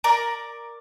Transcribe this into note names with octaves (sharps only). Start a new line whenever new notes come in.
A#4 D5